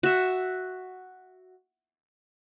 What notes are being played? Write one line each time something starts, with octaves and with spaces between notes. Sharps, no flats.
F#4 E5